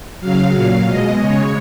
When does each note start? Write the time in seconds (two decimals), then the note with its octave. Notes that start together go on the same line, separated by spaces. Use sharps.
0.20 C#3 F#3 F5
0.53 A#2 F#3 F5
0.86 B2 G#3 D#5
1.20 C#3 G#3 C#5